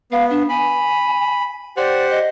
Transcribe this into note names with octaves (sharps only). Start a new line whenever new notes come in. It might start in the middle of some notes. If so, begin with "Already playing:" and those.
B3 F5
D4
G#5 B5
G4 C5 D5 F#5
D#5